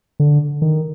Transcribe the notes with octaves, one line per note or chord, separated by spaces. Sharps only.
D3
D#3